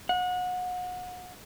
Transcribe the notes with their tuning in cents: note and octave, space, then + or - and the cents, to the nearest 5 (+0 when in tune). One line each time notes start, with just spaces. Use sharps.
F#5 -30